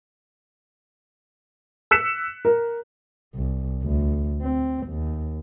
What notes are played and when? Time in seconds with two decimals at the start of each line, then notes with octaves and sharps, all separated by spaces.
1.91 E6 F#6 B6 C#7 E7
2.45 A#4
3.35 C2
3.83 D2
4.41 C4
4.87 D#2